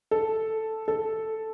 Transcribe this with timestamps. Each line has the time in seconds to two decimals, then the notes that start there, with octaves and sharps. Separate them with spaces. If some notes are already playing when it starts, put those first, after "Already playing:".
0.11 A4
0.88 A4